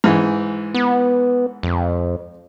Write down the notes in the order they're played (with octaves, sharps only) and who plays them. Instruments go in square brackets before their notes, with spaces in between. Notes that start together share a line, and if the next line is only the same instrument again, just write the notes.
[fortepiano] G#2 E3
[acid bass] B3
F2